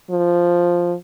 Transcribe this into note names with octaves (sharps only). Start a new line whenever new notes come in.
F3